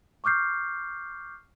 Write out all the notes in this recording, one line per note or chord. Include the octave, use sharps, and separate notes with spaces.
C#6 D6 F6 G6 C7